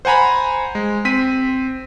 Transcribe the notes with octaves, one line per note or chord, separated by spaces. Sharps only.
C5 F#5 G#5 A#5 B5
G#3
C4 B6 D#7